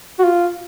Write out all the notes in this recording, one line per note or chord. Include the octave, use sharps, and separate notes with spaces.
F#4
F4